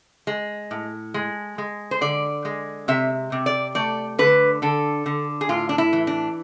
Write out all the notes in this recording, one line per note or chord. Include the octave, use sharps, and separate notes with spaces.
G#3
A2
G#3
G#3
C5
D3 D5
G#3
C3 E5
C3
D5
A3 D5
D3 B4
D3 A4
D3
G#4
A2 F4
D4
E4
E3
D4